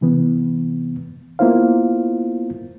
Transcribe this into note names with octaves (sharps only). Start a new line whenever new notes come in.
C3 E3 B3
A#3 B3 E4 F4 C5 F5